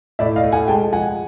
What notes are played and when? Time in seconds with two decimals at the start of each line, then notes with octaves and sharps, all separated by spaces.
0.19 A2 D5 E5
0.36 D#5 F5
0.44 A3
0.52 F#5 G#5
0.68 G#3 G5 A5
0.92 F3 F#5 G#5